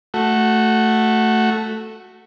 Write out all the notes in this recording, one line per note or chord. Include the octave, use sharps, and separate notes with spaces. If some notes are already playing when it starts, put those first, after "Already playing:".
A3 F#4